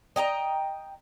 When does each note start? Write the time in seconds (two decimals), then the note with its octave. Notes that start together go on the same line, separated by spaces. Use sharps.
0.16 D#5 G5 G#5 A#5